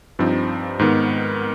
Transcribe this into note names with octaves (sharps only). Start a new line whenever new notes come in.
G2 F3 C4 D#4
G#2 D#3 B3